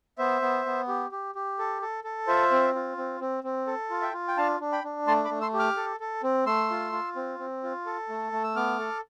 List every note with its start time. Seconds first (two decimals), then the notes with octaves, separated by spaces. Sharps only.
0.18 B3 C5 E5
0.42 B3
0.66 B3
0.88 G4
1.12 G4
1.35 G4
1.59 A4
1.82 A4
2.04 A4
2.27 F4 C5 E5
2.51 C4
2.75 F4
2.97 C4
3.20 C4
3.44 C4
3.67 A4
3.90 F4
4.02 E5 G5
4.13 F4
4.28 G5
4.37 D4 F5 A5
4.60 D4
4.72 G5 B5
4.84 D4
5.07 A3 A5 C6
5.25 B5 D6
5.30 A3
5.41 C6 E6
5.54 G4
5.59 D6 F6
5.77 A4
6.00 A4
6.23 C4
6.46 A3 C6 E6
6.70 F4
6.92 F4
7.16 C4
7.39 C4
7.63 F4
7.86 A4
8.09 A3
8.32 A3
8.44 E6
8.56 B3 D6 F6
8.79 A4